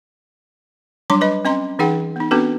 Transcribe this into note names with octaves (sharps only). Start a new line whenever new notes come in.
F#3 G3 D4 C6 D6
B4 D#5 B5
C4 C#4 D#5 A#5 C6
E3 D#4 G#4 F#5 G5
B3 D#4
B3 C4 D4 F#4 A4 B4